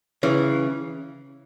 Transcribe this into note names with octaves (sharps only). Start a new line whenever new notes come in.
C#3 E3